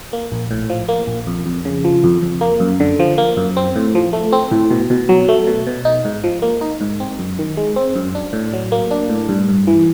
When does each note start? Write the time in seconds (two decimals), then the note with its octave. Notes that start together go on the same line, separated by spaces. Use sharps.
0.13 A#3
0.32 A#1
0.51 A2
0.70 F3
0.88 A#3
1.08 A#1
1.27 F2
1.46 F2
1.65 C#3
1.84 F3
2.04 F2
2.22 F2
2.41 A#3
2.60 F#2
2.80 D3
2.99 F3
3.18 A#3
3.37 F#2
3.57 C4
3.76 A2
3.95 F3
4.13 A3
4.32 C4
4.51 A2
4.71 B2
4.90 B2
5.09 F#3
5.28 A3
5.47 B2
5.67 B2
5.85 D#4
6.05 G#2
6.24 F3
6.42 A#3
6.61 D#4
6.81 G#2
7.00 C4
7.19 F#2
7.39 D#3
7.57 G#3
7.76 C4
7.96 F#2
8.15 D4
8.33 A2
8.53 F#3
8.72 A#3
8.91 D4
9.09 A2
9.29 G2
9.49 G2
9.67 E3